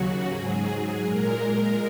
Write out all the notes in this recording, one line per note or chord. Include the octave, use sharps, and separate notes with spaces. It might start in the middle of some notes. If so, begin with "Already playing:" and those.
Already playing: D#2 C#3 F#3 F#4
G#2 F#3 G#4
A#2 G#3 A#4